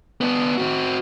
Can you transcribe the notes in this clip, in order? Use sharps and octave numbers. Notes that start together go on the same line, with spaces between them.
B3 D4
C4 F#4